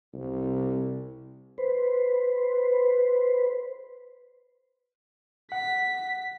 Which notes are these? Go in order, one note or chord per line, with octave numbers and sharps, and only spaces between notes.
C2
B4 C5
F#5 B6